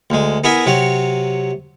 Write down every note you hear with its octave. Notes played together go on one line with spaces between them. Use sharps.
D2 G#3
B3 E4 G#4 A#4 E5
C3 F#3 C#5